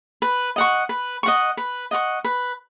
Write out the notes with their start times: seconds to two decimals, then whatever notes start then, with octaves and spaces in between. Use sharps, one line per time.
0.22 B4
0.56 D#5 F#5 C#6
0.89 B4
1.23 D#5 F#5 C#6
1.57 B4
1.91 D#5 F#5 C#6
2.24 B4